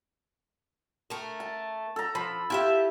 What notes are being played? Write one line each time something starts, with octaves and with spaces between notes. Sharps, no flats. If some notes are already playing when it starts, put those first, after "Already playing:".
A3 A#4
A5
A4 A#5
F3 B5
E4 F4 G4 E5